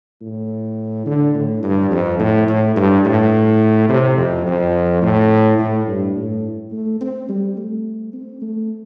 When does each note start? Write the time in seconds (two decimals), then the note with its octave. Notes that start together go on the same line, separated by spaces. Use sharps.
0.21 A2
1.06 D3
1.34 A2
1.63 G2
1.91 F2
2.19 A2
2.48 A2
2.76 G2
3.05 A2
3.89 C3
4.17 F2
4.46 F2
5.02 A2
5.58 A2
5.87 G2
6.16 A2
6.72 A3
7.01 C4
7.29 G3
7.57 A3
8.13 C4
8.42 A3